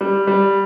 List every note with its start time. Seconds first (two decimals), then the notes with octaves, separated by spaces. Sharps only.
0.01 G3
0.27 G3